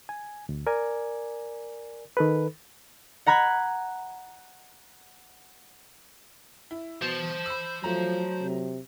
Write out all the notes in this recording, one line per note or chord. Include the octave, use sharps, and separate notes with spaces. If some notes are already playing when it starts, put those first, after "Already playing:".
G#5
D2
A#4 D5 G#5
D#3 A4 B4
F#5 A#5 B5 F#6 G#6
E4
B2 C5 A5
B5 E6
F3 F#3 A3 A#5
C3